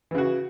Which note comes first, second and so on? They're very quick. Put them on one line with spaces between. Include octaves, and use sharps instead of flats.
E3 C#3 F#4